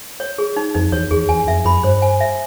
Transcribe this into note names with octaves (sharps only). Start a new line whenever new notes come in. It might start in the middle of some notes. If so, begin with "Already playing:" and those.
C#5
G#4
D#4
F2 D#4
E2 C#5
E2 G#4
E2 G#5
F2 E5
F2 B5
G2 C5
G#5
E5